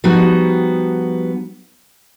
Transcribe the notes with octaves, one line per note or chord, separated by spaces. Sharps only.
F3 G3 B3 D#4 F#4